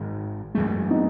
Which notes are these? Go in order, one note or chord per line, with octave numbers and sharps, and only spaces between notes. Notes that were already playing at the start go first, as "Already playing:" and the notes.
Already playing: G#1 G#2 D#3 G#3
F#2 E3 G#3 A3
B3 D#4